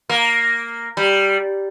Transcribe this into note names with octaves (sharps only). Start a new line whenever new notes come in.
A#3
G3